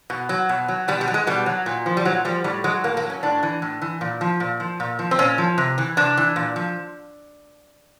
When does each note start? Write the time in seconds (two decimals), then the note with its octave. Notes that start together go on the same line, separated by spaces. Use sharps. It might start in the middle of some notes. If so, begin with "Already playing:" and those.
0.10 B2
0.29 F#3
0.49 B2
0.68 F#3
0.88 B2 G3
1.01 G3
1.08 F#3
1.14 G#3
1.27 B2 G3
1.46 F#3
1.66 A#2
1.86 F3
1.97 G3
2.05 A#2 F#3
2.25 F3 G3
2.44 A2 G3
2.64 F#3 G#3
2.84 A2 A#3
2.97 A#3
3.04 F#3
3.10 C#4
3.23 A2 D4
3.43 E3
3.62 A2
3.82 E3
4.01 A#2
4.21 F3
4.40 A#2
4.60 F3
4.80 A#2
4.99 F3
5.11 C4
5.19 A#2 C#4
5.38 F3
5.58 C3
5.78 E3
5.97 C3 D4
6.17 E3
6.36 A#2
6.56 F3